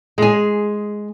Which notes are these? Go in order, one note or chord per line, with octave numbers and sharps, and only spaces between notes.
G#3 G#4